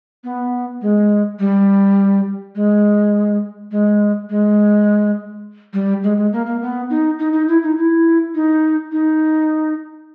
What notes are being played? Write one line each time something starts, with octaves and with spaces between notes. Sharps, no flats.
B3
G#3
G3
G#3
G#3
G#3
G3
G#3
G#3
A#3
A#3
B3
D#4
D#4
D#4
E4
D#4
E4
D#4
D#4